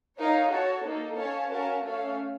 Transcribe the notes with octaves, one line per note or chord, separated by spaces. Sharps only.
D#4 A#4 C#5 F5
F#4 A4 C#5 A5
A#3 D#4 A4
C#4 A4 C#5 F5 A5
C#4 F#4 A#4 F5 A5
A3 C#4 A4 C#5 F5